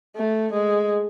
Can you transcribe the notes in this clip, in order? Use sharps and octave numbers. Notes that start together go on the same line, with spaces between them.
A3
G#3